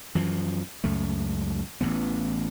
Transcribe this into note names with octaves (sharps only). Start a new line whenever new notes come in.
F#2 E3 F3
C#2 F#2 A3
A1 C#3 E3 B3